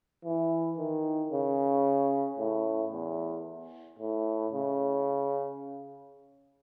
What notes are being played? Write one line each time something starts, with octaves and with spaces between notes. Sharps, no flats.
E3
D#3
C#3
A2
E2
A2
C#3